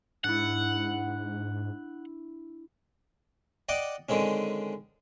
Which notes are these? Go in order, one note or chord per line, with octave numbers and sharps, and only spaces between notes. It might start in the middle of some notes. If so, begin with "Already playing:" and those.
G#2 D4 E4 F#5
D5 D#5 F#5 G5 D6
D3 D#3 G#3 C4 C#4